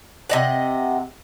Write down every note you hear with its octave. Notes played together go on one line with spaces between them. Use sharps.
C3 D#5 F#5